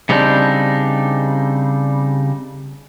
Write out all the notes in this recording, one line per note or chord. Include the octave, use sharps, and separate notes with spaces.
C#3 G3 C4 D4 D#4